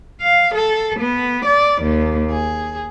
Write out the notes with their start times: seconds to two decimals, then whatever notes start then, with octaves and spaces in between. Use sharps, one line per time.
0.21 F5
0.54 A4
0.99 B3
1.46 D5
1.82 D#2
2.31 G#4